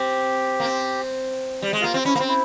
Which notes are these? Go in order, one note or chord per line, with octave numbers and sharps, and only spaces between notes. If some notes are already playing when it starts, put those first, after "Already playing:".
Already playing: C4 G4
A#3
C4
G3
G#3
A#3 F4
C4
C#4 E4
A#3
C4
E4